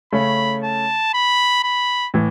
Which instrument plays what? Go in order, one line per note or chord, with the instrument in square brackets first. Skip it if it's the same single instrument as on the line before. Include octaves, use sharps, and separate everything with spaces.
[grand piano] C#3 A3 C#4 [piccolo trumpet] B5
[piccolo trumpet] A5
B5
B5
[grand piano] A2 E3